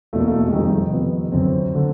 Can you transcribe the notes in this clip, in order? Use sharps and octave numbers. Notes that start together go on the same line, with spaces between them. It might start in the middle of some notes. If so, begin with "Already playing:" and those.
E2 B2 A3
A#3
A3
G#3
F2 C3 D#3 G3
F2 C3 D#3 B3
F#2 D3 C4
D3